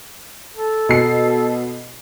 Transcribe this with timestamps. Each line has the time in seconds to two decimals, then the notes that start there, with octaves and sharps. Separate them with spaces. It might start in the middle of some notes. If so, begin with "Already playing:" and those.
0.56 A4
0.89 B2 C7